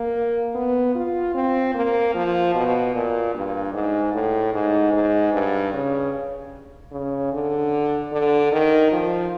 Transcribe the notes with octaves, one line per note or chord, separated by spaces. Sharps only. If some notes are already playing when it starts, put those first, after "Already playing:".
Already playing: A#3
B3
F4
C4
A#3
F3
B2
A#2
G2
G#2
A2
G#2
G#2
G2
C#3
C#3
D3
D3
D#3
F3